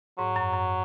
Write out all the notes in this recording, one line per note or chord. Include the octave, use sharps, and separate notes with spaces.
G#2 F#3
F#2
F#2